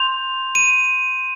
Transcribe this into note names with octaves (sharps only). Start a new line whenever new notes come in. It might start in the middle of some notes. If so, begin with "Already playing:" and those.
Already playing: C6 G6 F7
D#7